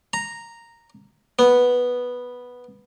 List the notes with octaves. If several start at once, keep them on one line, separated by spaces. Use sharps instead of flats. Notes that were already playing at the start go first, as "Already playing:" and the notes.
A#5
B3